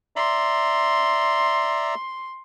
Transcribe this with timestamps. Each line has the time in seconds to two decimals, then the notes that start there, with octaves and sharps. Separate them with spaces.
0.16 D5 E5 A#5 C6